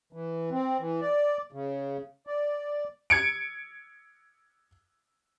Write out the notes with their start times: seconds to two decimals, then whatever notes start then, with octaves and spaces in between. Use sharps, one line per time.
0.13 E3
0.51 C4
0.80 E3
1.01 D5
1.52 C#3
2.27 D5
3.10 G#6 C#7 D7